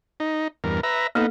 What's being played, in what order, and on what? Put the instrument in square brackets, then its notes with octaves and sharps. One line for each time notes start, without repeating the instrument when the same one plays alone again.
[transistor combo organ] D#4
E2 G2 A#4
B4 E5 A#5
[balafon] A#3 A4 [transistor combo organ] B3 D#4